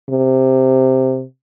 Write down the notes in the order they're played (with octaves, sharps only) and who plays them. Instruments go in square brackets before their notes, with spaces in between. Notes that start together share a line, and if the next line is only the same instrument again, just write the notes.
[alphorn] C3